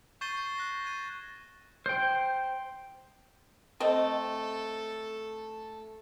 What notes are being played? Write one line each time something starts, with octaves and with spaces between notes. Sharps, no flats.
C#6 G6 A6 C7 D#7 G7
C7
F#6 A#6
G#6 D#7
C5 G5
A3 C4 A4 D#5